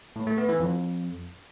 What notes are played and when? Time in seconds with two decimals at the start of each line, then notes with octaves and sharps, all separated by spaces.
0.16 A2
0.27 A3
0.38 B3
0.49 E3
0.60 F2